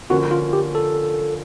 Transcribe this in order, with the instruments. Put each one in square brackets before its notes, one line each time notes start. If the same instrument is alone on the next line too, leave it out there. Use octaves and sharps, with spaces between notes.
[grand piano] D3 F3 A#3 C#4 [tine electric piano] F#4
[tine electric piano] F4
G4
A4